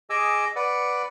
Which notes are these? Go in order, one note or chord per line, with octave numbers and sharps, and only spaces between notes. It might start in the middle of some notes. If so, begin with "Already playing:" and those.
G#4 D#5 G#5 D6 E6
B4 D5 F#5